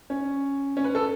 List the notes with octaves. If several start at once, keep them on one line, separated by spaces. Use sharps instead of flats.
C#4
C#4
B4
A4